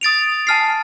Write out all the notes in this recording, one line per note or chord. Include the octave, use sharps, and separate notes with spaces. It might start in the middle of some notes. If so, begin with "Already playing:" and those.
D#6 A6 D7 F7
G#5 A5 F6 A6 C7